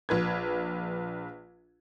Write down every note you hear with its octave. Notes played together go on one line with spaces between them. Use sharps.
A#1 B4 G#6